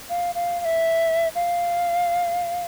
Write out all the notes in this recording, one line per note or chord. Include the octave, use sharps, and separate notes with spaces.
F5
F5
F5
E5
F5